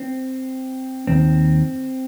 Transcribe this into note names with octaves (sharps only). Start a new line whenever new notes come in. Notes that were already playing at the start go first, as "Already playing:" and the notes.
Already playing: C4
D#2 D#3 C4